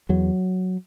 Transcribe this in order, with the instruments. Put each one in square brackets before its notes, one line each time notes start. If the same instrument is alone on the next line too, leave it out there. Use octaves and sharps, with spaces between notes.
[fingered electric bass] E2 F#3